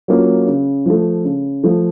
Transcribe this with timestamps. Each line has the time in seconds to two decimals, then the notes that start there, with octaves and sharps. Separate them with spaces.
0.08 F#3 A#3 C#4 F4
0.47 C#3
0.86 F3 A3
1.25 C#3
1.63 F3 A3